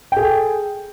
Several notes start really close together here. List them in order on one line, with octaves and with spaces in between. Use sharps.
G5 G#4 A4